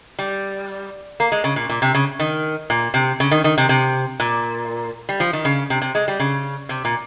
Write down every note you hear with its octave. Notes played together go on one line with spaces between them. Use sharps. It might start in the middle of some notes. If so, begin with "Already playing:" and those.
G3
A#3
G#3
C#3
A#2
A#2
C3
C#3
D#3
A#2
C3
C#3
D#3
D#3
C3
C3
A#2
G3
F3
D#3
C#3
C3
C3
G#3
G3
C#3
C3
A#2